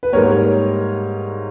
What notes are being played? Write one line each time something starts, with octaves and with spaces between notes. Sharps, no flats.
B4
G#2 G3 A#3 A#4 C#5